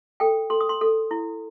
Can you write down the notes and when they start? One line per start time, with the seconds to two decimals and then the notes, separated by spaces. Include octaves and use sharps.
0.20 A4 G5
0.50 A4 C6
0.61 D#6
0.69 C6
0.81 A4
1.11 E4